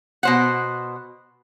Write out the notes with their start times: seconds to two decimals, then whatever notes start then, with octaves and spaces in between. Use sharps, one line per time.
0.23 B2 C5 F#5